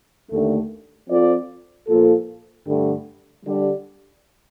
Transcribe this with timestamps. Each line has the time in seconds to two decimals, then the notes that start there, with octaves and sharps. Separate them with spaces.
0.30 D#2 D3 A3
1.08 F3 C4 F4 A4 D5
1.87 A#2 F3 A#3 F4 A4
2.65 G2 D3 A3
3.43 D3 G3 D4 G4 D5